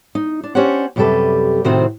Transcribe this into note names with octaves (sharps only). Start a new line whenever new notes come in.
D#4
D4
C#4 D4 G4 C5 C#5 F#5
F#2 C3 G3 G4 A4 B4
A2 C3 D#3 C4 F#4 C5